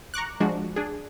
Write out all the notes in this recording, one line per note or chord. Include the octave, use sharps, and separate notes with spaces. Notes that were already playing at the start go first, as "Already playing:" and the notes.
A#5 C#6 D6 F#6
F3 G#3 D4 F#4
D4 G#4